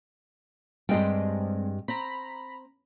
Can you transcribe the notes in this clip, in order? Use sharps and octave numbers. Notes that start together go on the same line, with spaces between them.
G2 G3 G#3 C4 D#5 G5
C4 A#5 B5